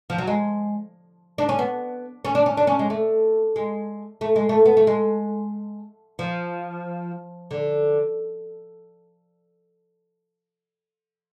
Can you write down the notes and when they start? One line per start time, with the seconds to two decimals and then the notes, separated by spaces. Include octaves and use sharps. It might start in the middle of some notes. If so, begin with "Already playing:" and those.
0.10 F3
0.18 F#3
0.27 G#3
1.38 D4
1.49 C#4
1.59 B3
2.25 C#4
2.35 D4
2.46 C#4
2.57 D4
2.67 C#4
2.79 G#3
2.90 A3
3.56 G#3
4.21 A3
4.36 G#3
4.49 A3
4.66 B3
4.77 A3
4.87 G#3
6.19 F3
7.51 D3